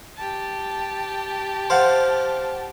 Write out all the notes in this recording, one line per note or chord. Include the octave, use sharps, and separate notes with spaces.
G4 A5
C5 F5 F#5